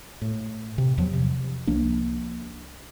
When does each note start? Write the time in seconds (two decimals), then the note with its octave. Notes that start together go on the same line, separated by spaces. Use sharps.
0.22 A2
0.78 C3
0.98 E2 F3 F#3
1.13 C3
1.67 C2 F3 A#3 D4